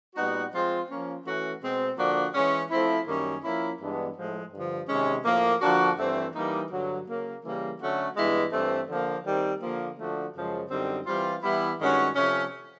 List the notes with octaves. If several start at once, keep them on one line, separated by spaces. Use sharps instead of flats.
A#2 G3 B3 D#4 F#4
F3 G#3 C4 F4
F3 A#3 C#4
E3 A3 C#4 F#4
B2 G#3 C4
D3 F3 A#3 D4 F#4
E3 G#3 C#4
F3 A3 C4 E4
F#2 D#3 G3 A#3 C#4
F3 A#3 C#4 E4
G2 E3 G#3 B3 D4
A2 F3 G#3
G2 D3 F3
C3 D#3 G#3 C#4
A2 F3 A#3
D3 F3 A#3 D4 F#4
G2 E3 A3 C4
E3 G3 A#3 D#4
G2 D3 F#3
C#3 F#3 A#3
C#3 E3 G3 A#3
D3 F#3 A3 C#4 F#4
G2 E3 G#3 B3 E4
G2 E3 A3 C4
D3 F3 A#3
D#3 G3 C4
D3 F3 A#3
D3 F3 A3 D4 F#4
F#2 C#3 F3 G#3
F#2 D3 G3 C4 D#4
E3 G3 C4 F4
E3 G3 B3 E4
G2 D#3 G#3 C#4 F#4
C3 F3 A3 C#4